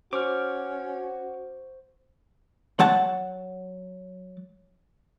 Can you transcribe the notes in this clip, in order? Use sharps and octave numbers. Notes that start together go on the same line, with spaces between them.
C#4 F#4 C5 C#6 D6 F6
F#3 F#5 A5